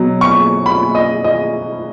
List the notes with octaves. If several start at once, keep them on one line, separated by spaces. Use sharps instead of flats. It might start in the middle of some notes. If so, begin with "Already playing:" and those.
Already playing: B2 F#3
C#6
B5
D#5
D#5